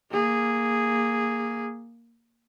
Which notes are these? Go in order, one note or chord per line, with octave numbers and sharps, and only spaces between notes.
A#3 G#4